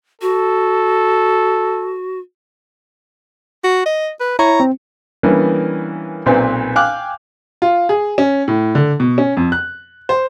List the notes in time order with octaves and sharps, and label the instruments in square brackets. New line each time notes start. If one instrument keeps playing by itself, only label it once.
[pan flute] F#4 [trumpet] A4
[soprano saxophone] F#4
D#5
B4
[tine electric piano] E4 C#5 C#6 [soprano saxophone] A#5
[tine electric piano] C4
[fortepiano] E3 G3 A#3 B3 C#4 D4
B1 A#2 C4 B4 C5 G#5
F5 G5 G#5 D6 F6 F#6
[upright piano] F4
G#4
C#4
A2
D3
B2
C#4
F2
F#6
C5